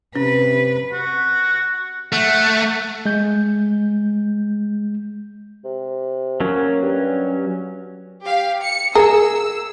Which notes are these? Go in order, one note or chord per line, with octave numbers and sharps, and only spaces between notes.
C3 C#4 B4
F#4
A3 F#5
G#3 G6
C3
F#3 A#3 C#4
G2
G4 F5
C#7
G#4 A#4 E6